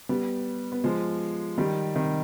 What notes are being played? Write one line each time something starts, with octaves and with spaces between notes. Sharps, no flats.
G3 B3
B3
F3 G#3
D#3 G3
C3 D#3